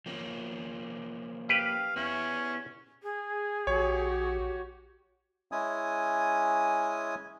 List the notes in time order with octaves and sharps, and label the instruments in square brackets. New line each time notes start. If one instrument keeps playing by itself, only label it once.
[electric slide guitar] F3 A#3 C#4
[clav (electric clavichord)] G4 B4 [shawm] F5
[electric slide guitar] B3 E4 [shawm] C#4
[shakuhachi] G#4
[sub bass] A#1 [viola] F#4 G4 [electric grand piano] C#5
[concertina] G#3 C#4 E4 G#5 D#6